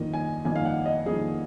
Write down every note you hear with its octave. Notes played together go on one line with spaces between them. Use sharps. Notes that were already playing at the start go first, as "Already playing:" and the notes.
Already playing: F2 D#3 A#3 D#5
G#5
F2 D#3 A#3 G#5
F5
F#5
D#5
F2 D#3 A#3 G#4